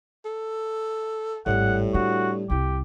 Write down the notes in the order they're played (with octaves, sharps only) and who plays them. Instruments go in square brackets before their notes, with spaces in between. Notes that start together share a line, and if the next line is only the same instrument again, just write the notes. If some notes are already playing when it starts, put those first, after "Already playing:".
[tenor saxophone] A4
[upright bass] G#1 [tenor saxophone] A2 [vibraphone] G3 G4 D5 [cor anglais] F#5
[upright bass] D4 [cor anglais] F#4
[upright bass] C2 E4 [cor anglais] G4